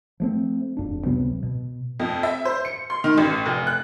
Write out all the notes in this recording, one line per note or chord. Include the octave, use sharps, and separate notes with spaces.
F3 A3 C4
E1 F2 D4
C#2 C3 F#3 B3
B2
F2
E5
C5
C#7
C6
D#3
A1
F1
F#6